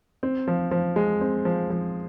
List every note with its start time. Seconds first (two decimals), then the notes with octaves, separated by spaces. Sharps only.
0.23 C4
0.48 F3
0.71 F3
0.96 G#3
1.21 C4
1.45 F3
1.70 F3